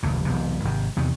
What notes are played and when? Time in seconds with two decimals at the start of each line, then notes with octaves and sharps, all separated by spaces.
0.03 F1 D2 A#2
0.25 E1 B1 C3
0.64 G#1 C3
0.96 E2 C3 D#3